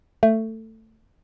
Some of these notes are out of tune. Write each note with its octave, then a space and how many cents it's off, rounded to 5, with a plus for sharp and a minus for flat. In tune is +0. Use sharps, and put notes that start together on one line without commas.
A3 +15